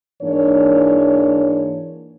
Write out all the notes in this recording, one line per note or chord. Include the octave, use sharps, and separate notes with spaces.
G#2 E3 A#3 D4 C#5